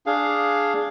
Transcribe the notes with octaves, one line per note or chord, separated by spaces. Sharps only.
D4 G#4 F5